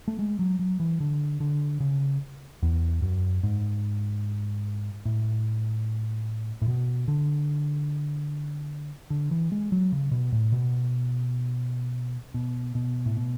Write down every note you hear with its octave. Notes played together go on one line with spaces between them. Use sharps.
A3
G#3
F#3
F#3
E3
D3
D3
C#3
E2
F#2
G#2
A2
A2
B2
D3
D3
E3
G#3
F#3
C#3
B2
A2
B2
B2
B2
A2
B2